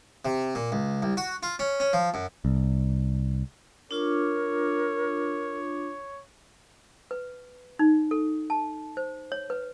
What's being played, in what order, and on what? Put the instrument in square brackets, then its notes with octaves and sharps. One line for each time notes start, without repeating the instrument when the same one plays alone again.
[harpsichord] C3
A#2
C#2
C2
F#4
F4
C#4
C#4
F3
F#2
[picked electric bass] C2
[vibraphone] D4 F4 D6 [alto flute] A#4 [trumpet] C#5
[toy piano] B4
D#4
A4
A5
C5
C#5
B4